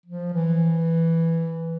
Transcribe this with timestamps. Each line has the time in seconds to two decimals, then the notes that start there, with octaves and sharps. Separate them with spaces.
0.06 F3
0.33 E3